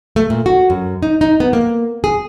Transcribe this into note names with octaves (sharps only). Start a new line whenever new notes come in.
A3
A#2
F#4
F#2
D#4
D#4
B3
A#3
G#4